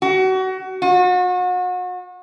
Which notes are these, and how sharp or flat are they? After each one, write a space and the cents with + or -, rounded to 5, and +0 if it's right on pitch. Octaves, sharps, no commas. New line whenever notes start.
F#4 +30
F#4 -35